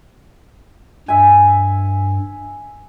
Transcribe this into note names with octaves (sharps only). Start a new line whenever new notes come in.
G2 E5 G#5